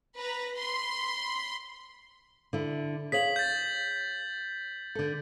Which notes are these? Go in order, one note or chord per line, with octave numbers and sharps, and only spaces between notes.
B4 A#5
B5 C6
D3 E4
G#4 C#5 F5 B6 F#7
G6 A6
D3 A4